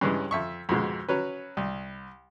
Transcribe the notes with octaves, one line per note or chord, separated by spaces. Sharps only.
G2 C#3 E3 G#3 C#4
F2 E5 C#6
F2 G#2 B2 G#3
F#3 C#4 B4
C2